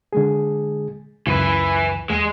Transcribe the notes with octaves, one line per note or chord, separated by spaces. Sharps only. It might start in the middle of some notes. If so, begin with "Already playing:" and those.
D3 G#3 G#4
C#2 F#2 E3 B4
E2 G#3